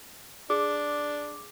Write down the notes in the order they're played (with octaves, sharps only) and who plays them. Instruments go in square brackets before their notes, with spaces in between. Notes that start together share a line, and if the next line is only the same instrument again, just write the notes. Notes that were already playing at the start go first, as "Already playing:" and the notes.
[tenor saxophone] D4 [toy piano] G#4 [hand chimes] D6